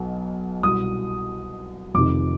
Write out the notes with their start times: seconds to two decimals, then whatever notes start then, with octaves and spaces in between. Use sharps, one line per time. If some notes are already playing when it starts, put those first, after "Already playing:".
Already playing: B1 B2
0.63 C2 B2 D#6
1.94 F1 F2 C3 D#3 D6